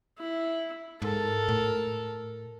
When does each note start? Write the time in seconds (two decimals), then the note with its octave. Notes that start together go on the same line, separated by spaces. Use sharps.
0.18 E4
1.02 G#2 A4 A#4
1.48 A2